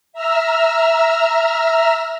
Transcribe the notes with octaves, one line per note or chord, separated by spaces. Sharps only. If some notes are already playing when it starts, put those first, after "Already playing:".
E5 A#5 E6 F6